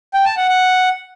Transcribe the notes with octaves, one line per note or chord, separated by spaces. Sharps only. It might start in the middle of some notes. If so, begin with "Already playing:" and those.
G5
A5
F#5
F#5